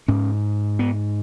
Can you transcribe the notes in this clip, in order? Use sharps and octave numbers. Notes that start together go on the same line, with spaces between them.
G#2 C#4
B3